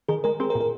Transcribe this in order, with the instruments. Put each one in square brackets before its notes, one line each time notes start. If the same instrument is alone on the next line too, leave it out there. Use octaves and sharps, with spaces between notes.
[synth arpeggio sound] D#3 [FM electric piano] G#4
[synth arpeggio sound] G#3 [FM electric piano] A#4
[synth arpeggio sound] C4 [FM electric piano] G#4
[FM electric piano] A#4
[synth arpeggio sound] A#2
[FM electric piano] A#4